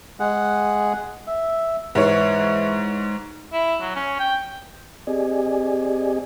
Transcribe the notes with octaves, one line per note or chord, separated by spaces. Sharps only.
G#3 G#4 F#5
E5
G#2 E3 C#5
E4
F#3
C#4
G5
C4 G4 G#4 D5 D#5 G#5